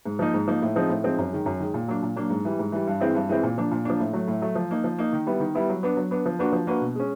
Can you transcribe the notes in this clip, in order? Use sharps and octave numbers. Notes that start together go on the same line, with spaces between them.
G#2
F3 A#3 D#4
G#2
F3 A#3 D#4
A2
F3 G#3 C4 D#4
A2
F3 G#3 C4 D#4
F#2
D#3 G#3
F#2
D#3 G#3
A#2
F#3 A#3 D4
A#2
F#3 A#3 D4
G#2
E3 G3
G#2
E3 G3
G2
E3 G#3 C4 E4
G2
E3 G#3 C4 E4
A#2
F3 A#3 D4
A#2
F3 A#3 D4
A2
F#3 A3
A2
F#3 A3
F3
A#3 D#4
F3
A#3 D#4
D#3
G3 B3 E4
D#3
G3 B3 E4
F#3
B3 D4
F#3
B3 D4
F3
A#3 D4 F#4 B4
F3
A#3 D4 F#4 B4
B2
G#3 C#4